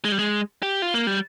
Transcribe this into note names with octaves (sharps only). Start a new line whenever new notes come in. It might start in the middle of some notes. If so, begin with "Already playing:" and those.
G#3
G3
G#3
G4
F4
A#3
G3